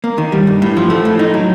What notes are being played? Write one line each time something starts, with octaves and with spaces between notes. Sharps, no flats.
A#3
D#3
G3
G2
A2
F3
A3
A2
D#4
F#3